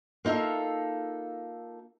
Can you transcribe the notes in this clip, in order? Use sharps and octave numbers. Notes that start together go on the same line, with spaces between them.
A#3 D#4 F4 A4 E5